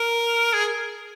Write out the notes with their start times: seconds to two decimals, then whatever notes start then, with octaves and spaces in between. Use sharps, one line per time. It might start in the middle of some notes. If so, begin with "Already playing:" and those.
Already playing: A#4
0.53 G#4